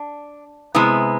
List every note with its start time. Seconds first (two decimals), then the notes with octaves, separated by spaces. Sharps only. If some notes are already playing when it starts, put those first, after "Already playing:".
Already playing: D4
0.75 C3 G#3 B3 E4